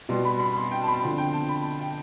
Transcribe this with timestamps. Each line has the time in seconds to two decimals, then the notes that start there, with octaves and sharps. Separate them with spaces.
0.09 B2 G3 B3 C6
0.25 B5
0.40 B5
0.56 C6
0.71 G5
0.82 A5
0.87 B5
1.02 D3 F3 C4 C6
1.18 G5
1.33 A5
1.49 B5
1.64 A5
1.81 G5